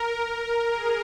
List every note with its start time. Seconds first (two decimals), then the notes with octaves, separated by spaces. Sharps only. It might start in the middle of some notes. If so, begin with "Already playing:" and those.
Already playing: A#4
0.21 A#4
0.66 G#4